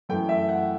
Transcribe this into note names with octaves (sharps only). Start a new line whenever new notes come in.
F#2 E3 A3 G5
E5
F#5